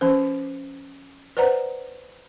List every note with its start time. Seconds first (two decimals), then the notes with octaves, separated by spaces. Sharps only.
0.01 F3 C#4 C5
1.37 B4 C5 D5 F#5 A#5